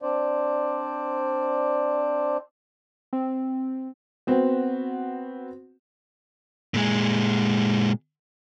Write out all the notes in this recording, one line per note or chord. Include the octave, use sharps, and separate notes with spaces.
C4 D4 C5 D5
C4
B3 C4 F#4
A#2 G#3